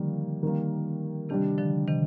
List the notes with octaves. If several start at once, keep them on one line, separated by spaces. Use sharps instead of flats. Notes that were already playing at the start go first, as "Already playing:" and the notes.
Already playing: D3 D#3 F3 G3 A#3
D#3 G3 A#3
C3 D#3 G3 D4 G4
D3 F3
C3 D#3